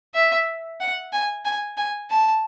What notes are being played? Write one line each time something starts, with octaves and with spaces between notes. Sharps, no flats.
E5
F#5
G#5
G#5
G#5
A5